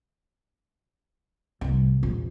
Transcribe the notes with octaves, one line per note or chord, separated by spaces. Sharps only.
C2 A2
A#1 E2